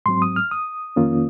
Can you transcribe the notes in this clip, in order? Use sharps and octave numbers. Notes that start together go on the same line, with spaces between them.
G#2 F#3 C4 C6
D#6
F6
D#6
F2 D#3 A#3 C#4 F4